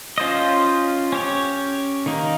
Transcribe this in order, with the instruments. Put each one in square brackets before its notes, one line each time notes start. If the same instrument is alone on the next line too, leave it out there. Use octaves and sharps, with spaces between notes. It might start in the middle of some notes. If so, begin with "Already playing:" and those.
[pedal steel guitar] C#4 F4 C5 D#5
C#4 G4 C#5
D#3 A#3 D#4